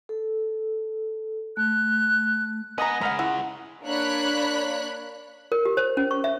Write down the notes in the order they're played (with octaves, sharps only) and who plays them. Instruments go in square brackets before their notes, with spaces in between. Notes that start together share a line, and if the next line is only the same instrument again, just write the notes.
[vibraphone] A4
[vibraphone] A3 [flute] F#6
[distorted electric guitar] B3 F#5 [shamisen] D#5 A#5 [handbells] G#5 D#6 A#6
[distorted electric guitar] G#3 C#4 [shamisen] E5 F#5 [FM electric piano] A#5 B5 F6
[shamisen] E4 [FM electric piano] F#5
[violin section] A#3 D4 C#5 B5 F#6
[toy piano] A#4
G4
C5
C#4
C#6
E5